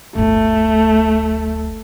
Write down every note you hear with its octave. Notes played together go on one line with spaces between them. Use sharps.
D1 G1 A3